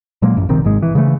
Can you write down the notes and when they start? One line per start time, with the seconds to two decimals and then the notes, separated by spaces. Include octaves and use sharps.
0.22 A#2 F#3 G#3 A#3
0.37 A1 F#2
0.49 A#1 C3 D#3 C4
0.64 G#1 G#2 G#3
0.82 E3
0.95 C#3 E3 G#3 A3